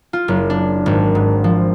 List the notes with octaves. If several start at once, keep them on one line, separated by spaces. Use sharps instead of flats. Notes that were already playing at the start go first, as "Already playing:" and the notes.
F4
F#1
D4
G#1
G#2
F3